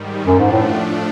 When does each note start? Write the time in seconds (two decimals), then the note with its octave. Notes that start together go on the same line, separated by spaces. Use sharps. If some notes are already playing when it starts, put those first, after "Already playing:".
Already playing: G#2 D#3 G3
0.27 F#2 F3 A3 D4
0.39 G#2
0.52 A2